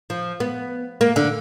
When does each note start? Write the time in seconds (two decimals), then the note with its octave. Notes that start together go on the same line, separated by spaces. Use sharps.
0.10 F3
0.40 B3
1.01 A#3
1.16 D3